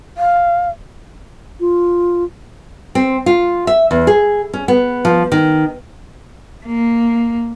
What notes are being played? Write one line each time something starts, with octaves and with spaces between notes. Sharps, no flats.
F5
F4
C4
F4
E5
E2
G#4
C#4
B3
F3
D#3
A#3